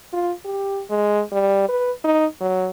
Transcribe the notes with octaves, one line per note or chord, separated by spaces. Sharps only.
F4
G4
G#3
G3
B4
D#4
F#3